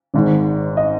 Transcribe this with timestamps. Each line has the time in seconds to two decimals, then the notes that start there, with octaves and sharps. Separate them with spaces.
0.14 G#1 G#2 D#3
0.77 D#5